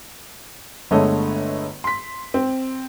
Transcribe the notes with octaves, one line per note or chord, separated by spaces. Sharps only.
G1 D3 G#3 A3 C#5 D#5
C6 B6
C4